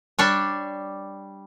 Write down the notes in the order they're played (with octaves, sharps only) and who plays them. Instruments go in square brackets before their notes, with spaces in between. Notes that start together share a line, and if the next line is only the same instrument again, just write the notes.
[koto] G3 D4 C#5